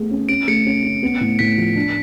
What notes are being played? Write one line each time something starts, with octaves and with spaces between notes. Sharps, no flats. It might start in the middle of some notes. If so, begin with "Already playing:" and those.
Already playing: A3 B3 G#4
C#4
C#4 D7
A3 C#7
C#4
C#4
B3
A2
A2 B6
F3
D4